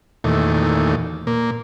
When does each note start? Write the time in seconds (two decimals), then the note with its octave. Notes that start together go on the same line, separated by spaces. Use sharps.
0.24 E2 A#2 D#3 A3
1.27 A#2 A#3